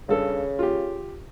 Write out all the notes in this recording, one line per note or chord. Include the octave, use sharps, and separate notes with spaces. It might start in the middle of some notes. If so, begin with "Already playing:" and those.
G2 C#3 A4
F4 G4